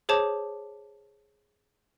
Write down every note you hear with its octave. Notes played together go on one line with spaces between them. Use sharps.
G#4 C5 C#5 A5 D6